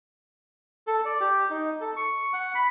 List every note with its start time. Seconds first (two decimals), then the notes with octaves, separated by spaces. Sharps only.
0.87 A4
1.05 D5
1.20 G4
1.50 D#4
1.81 A4
1.96 C#6
2.33 F#5
2.55 B5